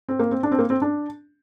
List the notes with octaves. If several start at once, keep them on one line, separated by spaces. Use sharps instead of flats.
C4
A#3
C4
D4
C4
A#3
C4
D4